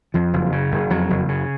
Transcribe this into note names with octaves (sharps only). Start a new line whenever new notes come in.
F2 F3
F#1
C#3
F#1
F2 F#3
F#1
C#3